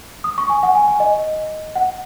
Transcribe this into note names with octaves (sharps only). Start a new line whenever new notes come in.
D#6
C#6
G#5
F#5
G#5
G#5
D#5
F#5